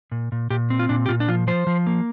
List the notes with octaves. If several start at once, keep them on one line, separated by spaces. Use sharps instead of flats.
A#2
A#2
A#2 G4
C4
F4
A#2 D4
G4
A#2 F4
D4
F3 F4
F3 C5
F3
A#3